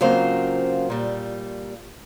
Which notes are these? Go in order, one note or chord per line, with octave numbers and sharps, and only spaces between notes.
C#3 F#3 A#3 C4 F4 C5
A#2 G3